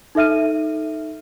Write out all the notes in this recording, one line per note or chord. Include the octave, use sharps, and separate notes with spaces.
D#4 A4 E5 F6 D#7